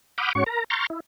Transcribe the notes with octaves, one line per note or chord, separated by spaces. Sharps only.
F#5 B5 D6 D#6 F6 G6
G#2 C#4 F#4 C#5 C#6
A#4 A#5
A#5 C6 C#6 F6 G6 A6
E4